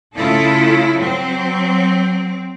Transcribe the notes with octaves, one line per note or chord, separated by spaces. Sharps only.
C#3 A3 E4 F4 A4
F#3 C4